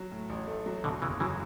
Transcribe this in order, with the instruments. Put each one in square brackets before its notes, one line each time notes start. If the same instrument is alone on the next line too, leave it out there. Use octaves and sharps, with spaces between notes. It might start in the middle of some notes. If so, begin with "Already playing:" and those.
Already playing: [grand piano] F#3
A2
A1
A3
F#3
[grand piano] E2 [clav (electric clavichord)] B2 D3
[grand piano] F#1 [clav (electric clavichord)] C#3 E3
[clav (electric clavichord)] C#3 E3 [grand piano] F#3